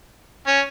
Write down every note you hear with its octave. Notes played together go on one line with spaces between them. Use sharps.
C#4